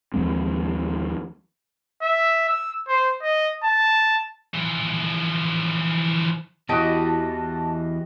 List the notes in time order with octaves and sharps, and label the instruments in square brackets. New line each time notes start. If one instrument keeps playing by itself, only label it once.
[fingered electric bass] D#2 F3 G#3 C4
[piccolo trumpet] E5
E6
C5
D#5
A5
[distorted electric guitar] E3 F3
[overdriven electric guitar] E2 E3 [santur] F#4 D#5 [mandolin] G4 [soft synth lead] A5